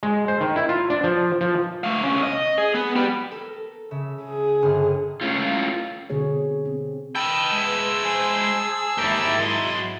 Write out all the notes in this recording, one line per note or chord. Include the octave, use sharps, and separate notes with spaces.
G#3
C5
D#3
E4
F4
D4
F3
F3
A3 F5
C2 C#4
D#5
G#4
B3
G4 B5
A4 A#4
C#3 E5
G#4
G1 G2 F6
A2 C#4 F4
B2 D3 C4 G#4 C#5
C4
B4 D#5 G5 A5 E6
G#3 E4
G#4 C5
G#1 A#3 D#4 E4 G4 A#4 A6
F#3 D#5 C6